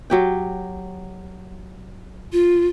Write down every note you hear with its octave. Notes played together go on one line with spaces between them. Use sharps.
F#3 G4 G5
F4